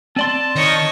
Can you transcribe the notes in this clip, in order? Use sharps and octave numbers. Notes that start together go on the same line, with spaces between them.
C4 D5 A5 C6
D#3 C#5 D#5